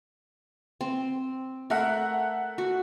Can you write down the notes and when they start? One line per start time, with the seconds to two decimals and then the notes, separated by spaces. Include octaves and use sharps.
0.81 C4
1.70 A3 A#4 E5 F#5
2.58 F#4